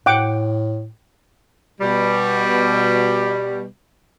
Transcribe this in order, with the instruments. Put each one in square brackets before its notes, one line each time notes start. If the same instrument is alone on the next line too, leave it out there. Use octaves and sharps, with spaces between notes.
[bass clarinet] A2 [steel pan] F#5 G5 D6
[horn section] B2 G3